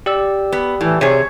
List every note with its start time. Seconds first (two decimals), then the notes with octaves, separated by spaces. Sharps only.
0.06 G4 D5 E6
0.52 B3
0.81 A2 E3
1.01 C3 G#4 C#5